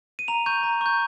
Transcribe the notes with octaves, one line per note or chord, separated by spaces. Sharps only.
D#7
A#5 F7
C#6 G6 D#7
A#5
C#6 G6